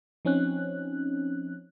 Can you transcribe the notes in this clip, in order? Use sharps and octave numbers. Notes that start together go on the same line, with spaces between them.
F3 C4 C#4 D#4 F#6